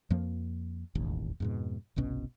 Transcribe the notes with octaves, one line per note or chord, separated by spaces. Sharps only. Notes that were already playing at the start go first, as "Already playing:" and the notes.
F2 F3 A#3
E1 A1 D#2
F2 G#2 B2
G1 C2 B2 C#4